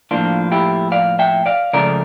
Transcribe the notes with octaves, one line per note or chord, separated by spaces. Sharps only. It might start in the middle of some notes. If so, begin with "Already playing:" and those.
A2 F3 A#3 D4 F4
E4 G4
D5 F5
E5 G5
D5 F5
C#2 C#3 F3 A3 A#4 D5